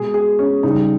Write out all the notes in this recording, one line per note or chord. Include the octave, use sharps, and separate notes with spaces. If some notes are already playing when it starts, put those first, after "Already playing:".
Already playing: B2 G#3 G#4
G#4
C#4
C#3 G3 D#4